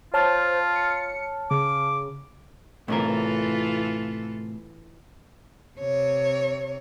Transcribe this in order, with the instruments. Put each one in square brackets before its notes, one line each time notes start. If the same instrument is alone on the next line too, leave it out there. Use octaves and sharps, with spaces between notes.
[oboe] F4 [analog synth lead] C5 [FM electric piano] C#5 A5 F6
[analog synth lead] C#7
[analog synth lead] C#3 [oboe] D6
[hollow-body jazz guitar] A2 C3 A#4 [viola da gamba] E3 F4 A4
[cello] C3 C#5